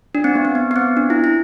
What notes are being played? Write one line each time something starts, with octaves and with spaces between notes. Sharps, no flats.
D4
C4
B3
C4
B3
B3
C4
D4
E4
E4